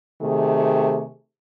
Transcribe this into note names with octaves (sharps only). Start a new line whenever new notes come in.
C3 D#3 A3 G#4